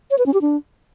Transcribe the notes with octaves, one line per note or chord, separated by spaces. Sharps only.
C#5
B4
C#4
G4
D4